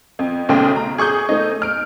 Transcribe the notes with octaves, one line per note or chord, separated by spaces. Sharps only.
F2
B1 C#3 A3 G5 C6
A#5
G#4 C#6 D#6 G6
A3 D#4
F6 D7